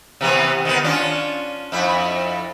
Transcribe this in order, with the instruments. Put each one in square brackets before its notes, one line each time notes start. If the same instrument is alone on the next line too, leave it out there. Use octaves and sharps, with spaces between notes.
[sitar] C3 E3 B3
D#3 B3
C#4 D4 F4
F2 E4